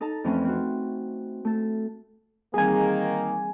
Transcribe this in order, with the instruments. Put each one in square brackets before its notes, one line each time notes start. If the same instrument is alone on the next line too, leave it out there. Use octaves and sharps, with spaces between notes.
[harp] D#4 A4 A5 A#5
F2 E3 F3 A3 C4 C#4
C4 F#4
A3 A4
[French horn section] D#3 A#3 [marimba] E3 G3 C4 [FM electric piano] G#4 G#5